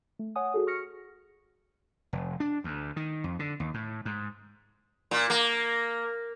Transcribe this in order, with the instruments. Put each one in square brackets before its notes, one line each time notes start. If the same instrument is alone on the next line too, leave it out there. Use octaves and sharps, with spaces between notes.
[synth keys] A3
C#5 F#5 G#5 D#6
F#4 G#4 A4
C#6 F6 A#6 C#7
[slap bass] F1
D4
D2
D#3
F2
D3
D#2
A2
G#2
[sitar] A#2
A#3